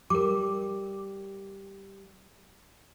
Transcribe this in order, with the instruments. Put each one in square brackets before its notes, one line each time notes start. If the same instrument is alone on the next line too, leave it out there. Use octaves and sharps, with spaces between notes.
[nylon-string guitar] G3 [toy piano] A#4 D6